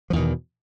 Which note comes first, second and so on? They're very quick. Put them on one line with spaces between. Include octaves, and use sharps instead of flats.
F3 E2 D#3 B2